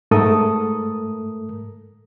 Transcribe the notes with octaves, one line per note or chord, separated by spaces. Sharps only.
G#2 A3 A4 A#4 D#6